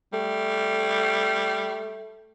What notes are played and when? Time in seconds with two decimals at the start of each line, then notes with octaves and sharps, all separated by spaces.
0.13 G3 A3